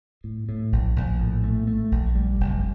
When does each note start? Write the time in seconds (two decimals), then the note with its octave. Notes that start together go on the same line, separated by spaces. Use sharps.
0.24 A2
0.49 A2
0.72 A#1
0.96 A#1
1.20 A2
1.44 A3
1.67 A3
1.91 A#1
2.15 G3
2.40 F1